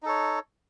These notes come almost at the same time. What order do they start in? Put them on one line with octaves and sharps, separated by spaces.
D#4 A4 C#5